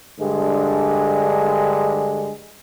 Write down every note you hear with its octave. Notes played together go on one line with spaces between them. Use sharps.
G2 D3 G#3